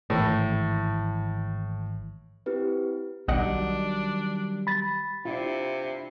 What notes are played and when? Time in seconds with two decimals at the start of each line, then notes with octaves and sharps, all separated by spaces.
0.10 G#1 A2 E3
2.46 C4 E4 G4 B4
3.28 B1 D#3 F#3 G3 D4 D#5 F#5
4.67 B5 A6
5.25 C3 D4 E4 F4